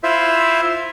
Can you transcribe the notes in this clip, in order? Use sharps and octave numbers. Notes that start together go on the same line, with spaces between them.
E4 F4 C5 E5